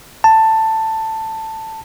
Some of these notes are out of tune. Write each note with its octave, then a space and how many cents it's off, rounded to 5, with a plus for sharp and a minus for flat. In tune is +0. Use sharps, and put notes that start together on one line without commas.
A5 +10